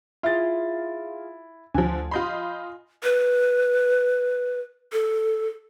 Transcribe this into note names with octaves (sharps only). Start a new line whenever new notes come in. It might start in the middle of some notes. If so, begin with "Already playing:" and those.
E4 F4 G#4 A6
D2 D3 F3 G#5
F4 D#5 B5 C6 G6
B4
A4